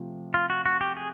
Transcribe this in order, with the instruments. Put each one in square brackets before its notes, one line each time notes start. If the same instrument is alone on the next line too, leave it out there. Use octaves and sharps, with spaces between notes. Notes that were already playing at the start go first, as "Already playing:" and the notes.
Already playing: [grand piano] C3 F3 A3
[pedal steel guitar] F4
F#4
F#4
G4
G#4